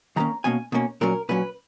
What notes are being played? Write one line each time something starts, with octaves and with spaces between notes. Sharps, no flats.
D#3 F#3 A#3 C#4 A#5
B2 A#3 C#4 G#5
B2 A#3 C#4
A#2 F#3 C#4 A#4
A#2 F#3 C#4 B4